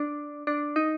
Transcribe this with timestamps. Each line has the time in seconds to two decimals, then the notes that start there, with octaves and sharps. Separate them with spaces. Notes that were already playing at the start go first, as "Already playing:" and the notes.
Already playing: D4
0.47 D4
0.76 D#4